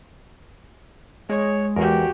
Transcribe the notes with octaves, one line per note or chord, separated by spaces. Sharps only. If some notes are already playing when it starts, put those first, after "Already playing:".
G#3 C#5
E2 F#4 G4 A#4